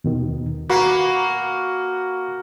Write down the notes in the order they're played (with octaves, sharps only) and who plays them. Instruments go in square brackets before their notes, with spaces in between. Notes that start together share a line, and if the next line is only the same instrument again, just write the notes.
[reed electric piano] D#2 B2 D#3
[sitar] A#3 [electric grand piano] F#4 [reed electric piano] B5